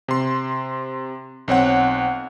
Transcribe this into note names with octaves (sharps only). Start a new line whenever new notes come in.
C3 C6
B1 C4 C#5 F#5